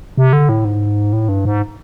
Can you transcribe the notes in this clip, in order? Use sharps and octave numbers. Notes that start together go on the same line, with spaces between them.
C3
D3
A2
G#2
A2
G2
G#2